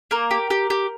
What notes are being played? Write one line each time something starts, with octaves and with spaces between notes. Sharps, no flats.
A#3 A#4
G4
G4
G4